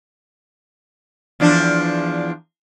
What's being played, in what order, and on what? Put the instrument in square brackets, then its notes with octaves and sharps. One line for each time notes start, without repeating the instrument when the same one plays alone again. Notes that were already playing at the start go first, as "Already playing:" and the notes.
[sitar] E2 F3 D4